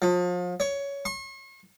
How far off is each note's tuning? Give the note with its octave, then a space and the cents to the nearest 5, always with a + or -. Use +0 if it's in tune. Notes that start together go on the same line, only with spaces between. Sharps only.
F3 +35
C#5 +15
C#6 -45